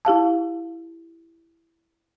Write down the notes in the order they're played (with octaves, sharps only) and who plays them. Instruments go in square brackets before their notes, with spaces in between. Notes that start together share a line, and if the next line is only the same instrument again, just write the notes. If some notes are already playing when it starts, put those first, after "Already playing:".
[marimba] E4 G4 F5 A5